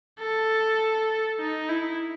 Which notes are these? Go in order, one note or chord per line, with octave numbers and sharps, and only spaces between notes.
A4
D#4
E4